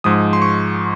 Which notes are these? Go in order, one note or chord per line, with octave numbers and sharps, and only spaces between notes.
G#2 F3 G#3 D#6
C6
C#6